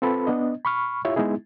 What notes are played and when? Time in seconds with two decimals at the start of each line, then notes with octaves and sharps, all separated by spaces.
0.02 C4 F4 A4 B4 B5
0.27 B3 D4 D#5
0.65 B5 C#6 F6
1.05 E4 F4 G4 C#5 E5
1.16 G#3 B3 D#4 E4 G#4